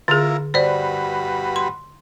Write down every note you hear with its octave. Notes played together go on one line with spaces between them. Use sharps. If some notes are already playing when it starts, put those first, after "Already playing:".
D3 E4 F4 G#4 A#4
G2 F#4 B4 C5 D5
C6